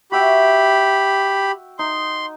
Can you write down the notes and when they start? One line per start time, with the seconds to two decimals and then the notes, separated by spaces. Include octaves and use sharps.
0.12 F#4 G4 E5 G5 B5
1.79 D#4 C6